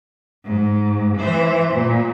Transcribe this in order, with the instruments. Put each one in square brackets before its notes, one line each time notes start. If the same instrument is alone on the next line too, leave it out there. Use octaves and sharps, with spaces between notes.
[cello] G#2
E3 C5
A#2